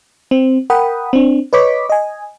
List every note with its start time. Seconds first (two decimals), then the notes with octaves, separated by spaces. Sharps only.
0.31 C4
0.70 A#4 F#5 G5 B5 D#6
1.13 C4 D4
1.53 B4 C#5 D#5 C#6 D6 B6
1.89 D#5 G#5